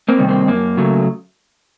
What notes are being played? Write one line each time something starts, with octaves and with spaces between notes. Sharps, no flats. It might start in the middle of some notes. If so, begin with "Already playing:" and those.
A#3 C4
C3 D#3 G3
A#3 C4
F#2 A#3
C#3 F#3 A3